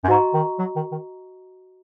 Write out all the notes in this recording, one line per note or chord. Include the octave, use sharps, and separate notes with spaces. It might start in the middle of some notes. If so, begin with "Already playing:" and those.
F#2
G#2 F#4 D#5 A#5 C#6
D#3
F#3
D#3
D#3